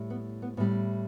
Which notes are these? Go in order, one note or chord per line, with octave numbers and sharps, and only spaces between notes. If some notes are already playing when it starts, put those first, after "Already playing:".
Already playing: A2 G3
B3
B3
A2 G3 B3